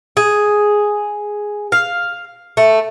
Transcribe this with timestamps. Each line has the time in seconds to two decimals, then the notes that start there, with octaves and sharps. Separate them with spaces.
0.17 G#4
1.72 F5
2.57 A3